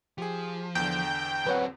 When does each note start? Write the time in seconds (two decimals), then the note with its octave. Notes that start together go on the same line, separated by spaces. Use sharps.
0.18 F3 G4 G#4
0.75 E2 D3 G5
1.47 F#3 C4 B4 C#5 F#5